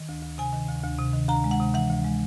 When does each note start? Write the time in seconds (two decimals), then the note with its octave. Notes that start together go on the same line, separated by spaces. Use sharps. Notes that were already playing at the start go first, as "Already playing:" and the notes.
Already playing: D#3
0.09 D2
0.23 D2
0.38 C3 G#5
0.53 D#3
0.69 D2
0.84 D2
0.98 C3
1.14 D#3
1.29 D2 A#5
1.44 G#3
1.51 F#5
1.60 C3
1.74 E3 F#5
1.90 D2
2.04 G#3